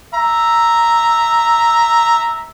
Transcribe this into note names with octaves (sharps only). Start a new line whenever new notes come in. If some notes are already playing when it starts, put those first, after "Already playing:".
E5 A#5